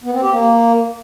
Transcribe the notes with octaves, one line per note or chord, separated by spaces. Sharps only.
B3
C4
G4
A#3